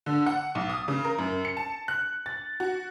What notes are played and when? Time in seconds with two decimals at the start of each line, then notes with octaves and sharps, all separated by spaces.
0.06 D3
0.26 F#5
0.55 B1
0.70 D#6
0.88 C#3
1.04 A#4
1.18 F#2
1.45 C#7
1.57 A5
1.88 F#6
2.26 A6
2.60 F#4